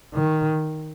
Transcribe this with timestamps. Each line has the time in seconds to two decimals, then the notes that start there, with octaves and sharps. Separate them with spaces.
0.14 D#3